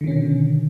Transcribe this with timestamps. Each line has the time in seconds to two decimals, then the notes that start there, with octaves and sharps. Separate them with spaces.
0.01 D3
0.04 D#3
0.07 C#4
0.11 B2